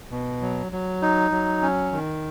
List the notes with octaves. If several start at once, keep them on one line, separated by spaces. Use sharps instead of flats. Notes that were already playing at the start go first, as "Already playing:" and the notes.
B2
F#3
F#3
D#4
F#3
C#4
D#3